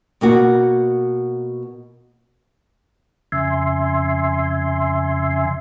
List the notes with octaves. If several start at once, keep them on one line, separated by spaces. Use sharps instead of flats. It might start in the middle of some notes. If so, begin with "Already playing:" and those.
B2 A#3 F#4
F2 C#3 E5 G#5 C6